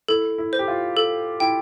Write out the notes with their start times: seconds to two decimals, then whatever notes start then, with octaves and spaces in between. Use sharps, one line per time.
0.08 E4 A4
0.38 E4
0.53 C5
0.59 G4
0.68 F4
0.97 A4
1.40 E4 G5